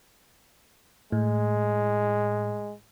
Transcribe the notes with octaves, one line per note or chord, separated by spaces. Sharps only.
A2 G#3